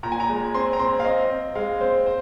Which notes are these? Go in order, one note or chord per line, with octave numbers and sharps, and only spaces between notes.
A#2 A#5
G#5
A#5
G#3
C4 C6
A#5
C4 C6
F5
C4 D#5
C4
G#3 F5
C4 C5
C5